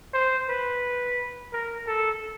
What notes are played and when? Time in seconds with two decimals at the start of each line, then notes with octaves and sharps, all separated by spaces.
0.14 C5
0.49 B4
1.53 A#4
1.87 A4